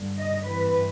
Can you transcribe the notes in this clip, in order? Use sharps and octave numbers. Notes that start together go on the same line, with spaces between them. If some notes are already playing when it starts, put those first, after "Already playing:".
Already playing: G2 D3 G3
D#5
G2 E3 G3 C4 B4